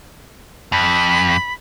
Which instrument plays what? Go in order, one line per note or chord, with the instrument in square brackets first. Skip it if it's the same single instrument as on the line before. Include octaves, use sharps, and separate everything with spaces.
[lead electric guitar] F2 [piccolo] B5